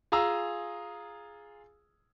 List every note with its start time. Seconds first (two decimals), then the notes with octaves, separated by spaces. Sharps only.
0.12 F4 G#4 G#5 A#5 E6